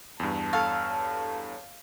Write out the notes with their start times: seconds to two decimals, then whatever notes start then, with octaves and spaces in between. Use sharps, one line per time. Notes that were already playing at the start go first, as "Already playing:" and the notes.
0.20 E2 G2 A5
0.53 A4 C#5 F5 F6